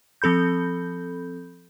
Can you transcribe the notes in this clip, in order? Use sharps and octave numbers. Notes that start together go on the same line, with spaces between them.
F3 C4 A4 B5 G6